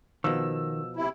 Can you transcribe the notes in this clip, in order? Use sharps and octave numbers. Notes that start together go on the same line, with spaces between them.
B2 D#3 F3 E6
C3 E4